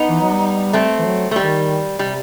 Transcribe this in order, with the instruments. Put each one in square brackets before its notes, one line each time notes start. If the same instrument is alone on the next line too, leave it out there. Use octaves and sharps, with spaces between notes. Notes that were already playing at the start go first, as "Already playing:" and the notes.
Already playing: [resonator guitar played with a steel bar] B3 D#4
[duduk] E3
F#3
G3
[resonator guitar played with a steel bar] A3 C4
[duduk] E3
F#3
[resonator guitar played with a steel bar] A3
[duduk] D#3 [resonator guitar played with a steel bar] G3
[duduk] C3 [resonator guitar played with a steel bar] G3